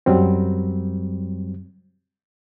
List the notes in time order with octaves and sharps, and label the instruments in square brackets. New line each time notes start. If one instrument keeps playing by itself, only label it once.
[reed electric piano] F#2 F#3 G3 C4